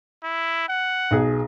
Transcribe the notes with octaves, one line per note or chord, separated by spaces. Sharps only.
E4
F#5
B1 G#4